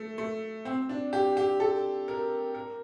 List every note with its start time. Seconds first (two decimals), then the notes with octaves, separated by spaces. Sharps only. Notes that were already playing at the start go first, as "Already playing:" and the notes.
Already playing: A3
0.18 A3
0.65 C4
0.89 D4
1.13 G4
1.37 G4
1.60 A4
2.08 A#4
2.55 A#4